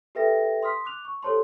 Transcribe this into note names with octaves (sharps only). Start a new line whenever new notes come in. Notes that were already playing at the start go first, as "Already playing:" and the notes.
G4 A4 B4 E5 G5 A#6
C6 D#6 F6 B6
D6 F#6 F7
C#6
G4 A4 C5 C#5 A5 C6